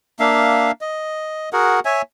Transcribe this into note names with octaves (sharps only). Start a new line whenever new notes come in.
A#3 D4 E5 F5
D#5
F#4 G#4 A#4 F#5
C#5 E5 G#5